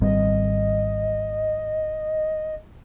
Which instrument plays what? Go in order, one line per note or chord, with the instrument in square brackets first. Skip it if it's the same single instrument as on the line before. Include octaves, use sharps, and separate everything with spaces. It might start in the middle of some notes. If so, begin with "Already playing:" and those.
[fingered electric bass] G#1 G3 C4 [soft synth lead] D#5